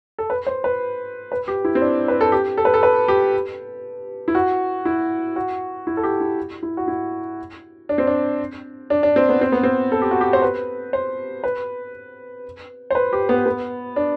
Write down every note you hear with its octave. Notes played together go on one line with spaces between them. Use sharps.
A4
B4
C5
B4
B4
G4
E4
C4
D4
B4
A4
G4
A4
B4
A4
B4
G4
E4
F#4
E4
F#4
E4
A4
G4
E4
E4
F#4
E4
D4
C4
D4
D4
D4
C4
B3
C4
B3
C4
A4
G4
F#4
G4
C5
B4
C5
B4
C5
B4
G4
B3
B3
D4